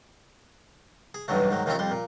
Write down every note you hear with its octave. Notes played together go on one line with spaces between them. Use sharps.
G#4
B1 G2 E3 F#3 A3
G#2 D#3 F#3
D#2 D#3 F3 A3 C4 C#4
F2 G3 C6
A#2